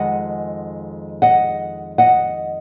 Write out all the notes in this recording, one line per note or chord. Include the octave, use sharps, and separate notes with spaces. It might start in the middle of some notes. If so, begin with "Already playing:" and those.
Already playing: F2 D#3 G#3 D#5 F#5
D#5 F#5
D#5 F#5